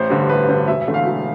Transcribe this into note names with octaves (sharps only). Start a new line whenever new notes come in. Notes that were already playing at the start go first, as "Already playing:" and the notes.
Already playing: A1 C5
G2 D3
A1 B4
G2 D3 C5
E1 E5
E5
E2 D3 A3
F5
E1